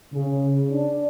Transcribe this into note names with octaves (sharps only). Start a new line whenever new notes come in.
C#3
D4